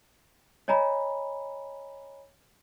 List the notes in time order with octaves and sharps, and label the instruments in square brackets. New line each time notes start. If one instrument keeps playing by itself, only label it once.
[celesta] C#5 D#5 G#5 A#5 B5